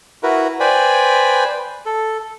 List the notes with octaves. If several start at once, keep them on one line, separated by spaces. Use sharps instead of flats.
E4 F#4 A#4 B4
B4 C5 D5 G5 G#5 B5
A4